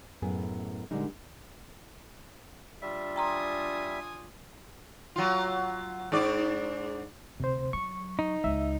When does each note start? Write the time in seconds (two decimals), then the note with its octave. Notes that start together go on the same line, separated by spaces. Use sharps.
0.22 F#2 A2 B3 G#4 G#5
0.91 A#2 D3 G3 G#3 D#4
2.82 G3 D4 F4 E5
3.16 G5 G#5 A#5 C6 D#6
5.16 F#3 F4
6.12 G#2 D4 D5
7.40 D2 C3 D#3 C5
7.73 F#3 C#6
8.19 D#4
8.44 C#2 E5